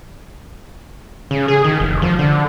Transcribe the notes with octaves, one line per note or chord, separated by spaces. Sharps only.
C#3
G#4
D#3
F1
F3
D3